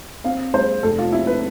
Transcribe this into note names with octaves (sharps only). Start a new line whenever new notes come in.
C4 F5
G#3 C5
F1 A4
F4
C3 E4
B4